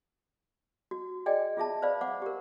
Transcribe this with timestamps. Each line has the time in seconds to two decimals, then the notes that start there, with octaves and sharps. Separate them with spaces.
0.91 F#4
1.26 G#4 D5 D#5 G5 G#5
1.57 F4 G#4 E5 A5
1.82 B4 C5 D5 F5 B5
2.01 C5 F#5 D6
2.22 G4 A#4